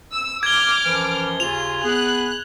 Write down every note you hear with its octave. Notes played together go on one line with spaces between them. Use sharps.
E6
D6 F6 G#6 G7
F#2 E3 F3
D#2 C#3 F4 G#5 F7
B3 G#4 F#6